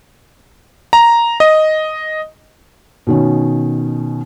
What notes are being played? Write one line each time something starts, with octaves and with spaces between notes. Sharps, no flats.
A#5
D#5
B2 D#3 C#4